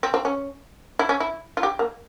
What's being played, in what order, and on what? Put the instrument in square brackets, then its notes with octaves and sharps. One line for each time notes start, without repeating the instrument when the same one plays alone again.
[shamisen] C4
C4
C#4
E4
C#4
E4
F4
G4
A#3